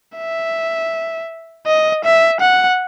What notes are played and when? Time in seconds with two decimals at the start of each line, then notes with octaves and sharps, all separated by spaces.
0.17 E5
1.67 D#5
2.05 E5
2.41 F#5